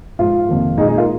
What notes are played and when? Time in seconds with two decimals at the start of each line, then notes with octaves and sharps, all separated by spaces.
0.19 G#2 F3 G#3 F4
0.49 F2 C3 D#3 A#3
0.78 A#2 G#3 D#4 G#4
0.88 D#4 G#4
0.98 F4 A#4